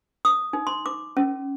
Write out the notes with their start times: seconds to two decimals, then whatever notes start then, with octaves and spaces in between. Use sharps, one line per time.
0.25 D#6
0.53 D#4
0.67 C6
0.86 D6
1.17 C#4